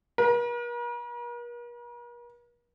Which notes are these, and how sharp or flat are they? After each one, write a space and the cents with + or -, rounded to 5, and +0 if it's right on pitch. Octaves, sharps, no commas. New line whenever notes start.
A#4 +45